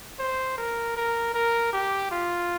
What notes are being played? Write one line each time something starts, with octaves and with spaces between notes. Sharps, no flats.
C5
A#4
A#4
A#4
G4
F4